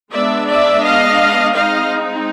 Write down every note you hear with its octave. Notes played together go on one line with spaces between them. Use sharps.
G#3 B3 D4 D5 E5
D5 E5
D#5 F5
G#3 C4 D#4 D#5 F5